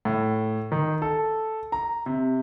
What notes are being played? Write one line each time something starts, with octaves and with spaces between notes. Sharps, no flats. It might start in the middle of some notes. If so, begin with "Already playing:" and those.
A2
D#3
A4
A#5
C3